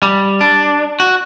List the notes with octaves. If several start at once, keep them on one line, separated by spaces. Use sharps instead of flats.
G3
D4
F#4